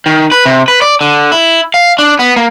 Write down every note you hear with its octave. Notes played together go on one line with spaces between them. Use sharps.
D#3
B4
C3
B4
D5
D3
E4
F5
D4
B3
A#3